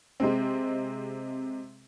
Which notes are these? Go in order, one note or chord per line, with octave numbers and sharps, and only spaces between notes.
C3 G#3 C4